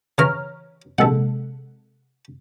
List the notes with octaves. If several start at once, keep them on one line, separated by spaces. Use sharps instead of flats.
C#3 E3 C#5 A#5 F6
A#1 C3 G#3 A4 F#5